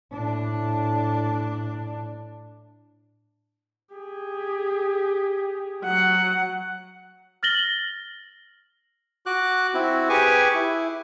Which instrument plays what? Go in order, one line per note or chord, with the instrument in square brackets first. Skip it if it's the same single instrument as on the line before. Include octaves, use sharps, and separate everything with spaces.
[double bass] A2 D4
[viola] G4 G#4
F#3 F#5
[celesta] F6 A6 A#6 F#7 G7
[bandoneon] F#4 D6 F#6
C4 E4 F#4
G4 G#4 B4 G#5 C#6 D6
E4